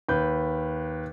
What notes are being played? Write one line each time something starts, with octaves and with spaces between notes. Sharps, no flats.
D#2 B4 G6